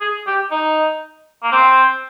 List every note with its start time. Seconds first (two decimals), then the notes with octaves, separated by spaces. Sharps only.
0.01 G#4
0.27 G4
0.51 D#4
1.43 A#3
1.52 C4